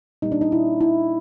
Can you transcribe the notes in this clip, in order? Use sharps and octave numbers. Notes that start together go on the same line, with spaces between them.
A#2 G3 A#3 D#4
D4
D#4
E4
E4